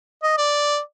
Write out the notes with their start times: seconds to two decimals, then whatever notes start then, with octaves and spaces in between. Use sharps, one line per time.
0.23 D#5
0.38 D5